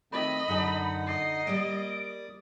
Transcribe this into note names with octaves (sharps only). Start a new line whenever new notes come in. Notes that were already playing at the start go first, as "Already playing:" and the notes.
D#3 A3 C4 D#5 B5
F#2 D3 D#4 G4 F#5 A5
D#5 C7
G3 A#3 D5 D6 D#6 D7